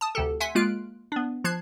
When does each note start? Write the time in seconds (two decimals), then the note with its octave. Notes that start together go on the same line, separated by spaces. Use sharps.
0.01 A5 D#6
0.15 D2 C3 G4 A4
0.40 E5 F#5 G#5 C6 B6
0.55 G#3 A#3 F4 F6 F#6 D7
1.12 B3 D4
1.44 F3 A5 F#6 G#6 C7